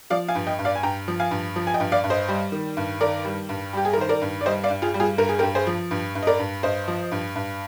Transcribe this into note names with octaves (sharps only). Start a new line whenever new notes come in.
F3 D5 F5
F5 G#5
G2
D#5 G5
G2
D5 F5
G#5
G2 G5 A#5
F3
F5 G#5
G2
F3
G#5
D#5 G5
G2
D5 F5
G2
C5 D#5
G3
D#3
G2
D#3 A#4 D5
G3
G2
G3 G4
G#4
A#4
D#3 C5
A#4 D5
G2
D5
G3 C5 D#5
D5 F5
G2
F4 G#4
G3
F4 G#4
G2 A#4
G#4
G4 A#4
G2
G#4 C5
F3
G2
G2
D#5
A#4 D5
G2
G2 C5 D#5
F3
G2
G2